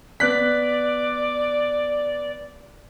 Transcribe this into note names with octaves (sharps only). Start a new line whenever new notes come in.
B3 D5 F#6 B6